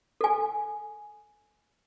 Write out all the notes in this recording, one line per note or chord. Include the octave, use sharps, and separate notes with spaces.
A4 G#5